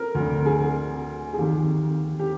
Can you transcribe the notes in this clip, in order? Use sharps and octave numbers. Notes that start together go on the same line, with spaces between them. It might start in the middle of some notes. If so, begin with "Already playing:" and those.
Already playing: A#4
D2 D3
G#4
G#4
D#2 D#3 G4
G4